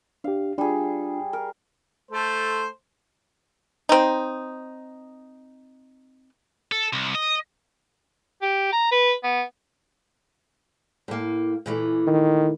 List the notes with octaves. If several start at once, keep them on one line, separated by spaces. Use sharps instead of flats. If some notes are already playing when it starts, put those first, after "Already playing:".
D4 G4 F5
G3 D4 F4 G#4
A#4
A3 A4 C5
C4 D#4
A4
C2
D#5
G4
A#5
B4
B3
A2 A#3
A#2 E3 A3
D#3